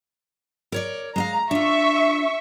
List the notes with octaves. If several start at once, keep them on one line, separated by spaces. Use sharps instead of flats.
A#4 C#5 D5
G#3 D#5 F5 A#5
D4 F4 E5 C#6